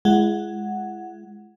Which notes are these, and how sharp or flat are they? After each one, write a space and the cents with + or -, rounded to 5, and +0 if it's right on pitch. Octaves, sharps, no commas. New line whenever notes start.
G#3 +0 E4 +40 F#5 +0